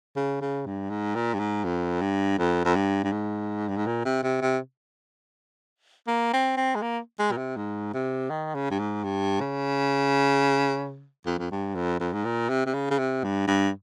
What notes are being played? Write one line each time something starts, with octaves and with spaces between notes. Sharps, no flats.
C#3
C#3
G2
G#2
A#2
G2
G#2
F2
G2
F2
F2
G2
G2
G#2
G2
G#2
A#2
C3
C3
C3
A#3
C4
C4
G#3
A#3
G#3
A#2
C3
G#2
C3
D#3
C#3
G2
G#2
G2
C#3
F2
F2
G2
F2
F2
G#2
A#2
C3
C3
C#3
C#3
C3
G2
G2